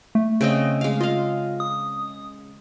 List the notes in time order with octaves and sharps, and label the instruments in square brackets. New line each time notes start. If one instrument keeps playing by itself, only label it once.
[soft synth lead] A3
[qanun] C#3 C4 D#5
G#3 F5
[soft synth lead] F4 [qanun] D#5 F5
[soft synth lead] D#6